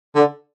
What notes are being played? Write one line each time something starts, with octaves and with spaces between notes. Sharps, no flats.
D3